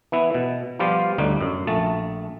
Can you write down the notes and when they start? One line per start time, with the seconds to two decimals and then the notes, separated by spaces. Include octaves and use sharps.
0.12 E3 B3 E4
0.34 B2
0.79 F3 G3 B3 F4 G4 F5
1.18 G1 D2 A2 G3 D#4
1.41 F#2
1.67 A#1 A3 A5